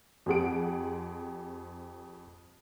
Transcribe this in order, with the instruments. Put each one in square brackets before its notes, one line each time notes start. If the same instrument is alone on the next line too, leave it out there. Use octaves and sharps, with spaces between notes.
[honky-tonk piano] F2 C4 G4 G#4 F#5 D7